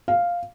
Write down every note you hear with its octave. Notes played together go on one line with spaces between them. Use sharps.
F5